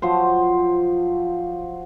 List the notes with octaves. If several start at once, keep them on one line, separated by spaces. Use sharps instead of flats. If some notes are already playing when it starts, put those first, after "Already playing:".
F3 F#3 C5